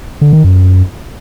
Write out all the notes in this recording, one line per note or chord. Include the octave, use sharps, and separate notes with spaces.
D3
D#3
F#2